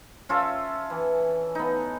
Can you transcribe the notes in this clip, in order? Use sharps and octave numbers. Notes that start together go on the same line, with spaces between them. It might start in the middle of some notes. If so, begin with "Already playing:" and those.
C#4 F4 A4 E5
E3
B3 D#4